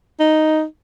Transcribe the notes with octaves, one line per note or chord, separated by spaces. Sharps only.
D#4